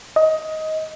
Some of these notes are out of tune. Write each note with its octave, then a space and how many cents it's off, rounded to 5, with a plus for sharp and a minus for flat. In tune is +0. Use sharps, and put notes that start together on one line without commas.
D#5 +15